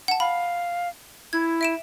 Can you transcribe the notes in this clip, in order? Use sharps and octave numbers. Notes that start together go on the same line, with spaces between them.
F#5 A5
F5 B5
E4 G#6
E5 D7 E7